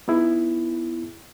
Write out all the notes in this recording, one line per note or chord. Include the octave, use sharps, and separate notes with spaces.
B3 D#4 E4 G#4